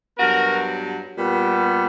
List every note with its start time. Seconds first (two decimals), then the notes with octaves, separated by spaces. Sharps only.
0.18 G2 F#3 B3 F#4 A#4
1.18 A#2 G3 B3